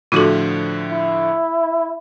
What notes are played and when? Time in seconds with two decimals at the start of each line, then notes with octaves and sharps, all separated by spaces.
0.12 A2 D3 F3 F4 F#4 A4
0.91 E4